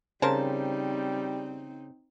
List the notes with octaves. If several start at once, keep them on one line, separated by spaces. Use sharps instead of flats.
C#3 G3 C4 D#4 A#4 C5 A5